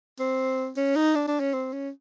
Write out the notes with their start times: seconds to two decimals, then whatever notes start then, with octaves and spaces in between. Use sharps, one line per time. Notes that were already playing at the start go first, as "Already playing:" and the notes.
0.19 C4
0.77 C#4
0.95 D#4
1.15 D4
1.28 D4
1.40 C#4
1.53 C4
1.73 C#4